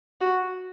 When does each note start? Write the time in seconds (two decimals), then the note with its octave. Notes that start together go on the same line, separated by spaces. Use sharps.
0.21 F#4